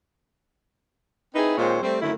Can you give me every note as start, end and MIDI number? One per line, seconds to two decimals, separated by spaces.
1.35 1.56 60
1.35 1.56 63
1.35 1.56 64
1.35 1.56 68
1.35 1.56 71
1.58 1.80 39
1.58 1.80 46
1.58 1.80 56
1.58 1.80 60
1.58 1.80 72
1.58 1.80 73
1.82 2.02 55
1.82 2.02 57
1.82 2.02 60
2.02 2.12 42
2.02 2.12 50
2.02 2.12 51
2.02 2.12 57
2.02 2.12 64